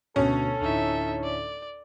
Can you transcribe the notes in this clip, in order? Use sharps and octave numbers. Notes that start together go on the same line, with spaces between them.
D2 B2 C#4 A4
D2 A2 D#4 E5
D5